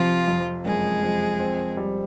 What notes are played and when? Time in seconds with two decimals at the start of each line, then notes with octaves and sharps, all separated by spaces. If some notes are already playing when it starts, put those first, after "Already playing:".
Already playing: C3 F3 F4
0.28 F2
0.65 F#1 G#3 G#4
1.02 F2
1.39 C4
1.77 G3